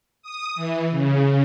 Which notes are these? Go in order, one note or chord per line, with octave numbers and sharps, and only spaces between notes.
D#6
E3
C#3